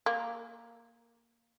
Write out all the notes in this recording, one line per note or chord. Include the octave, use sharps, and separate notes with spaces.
A#3